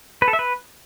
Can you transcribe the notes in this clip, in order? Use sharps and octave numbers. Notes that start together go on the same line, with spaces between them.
B4
A4
E5
B4